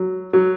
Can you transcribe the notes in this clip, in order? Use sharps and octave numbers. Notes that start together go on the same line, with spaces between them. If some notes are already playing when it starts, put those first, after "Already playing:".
Already playing: F#3
F#3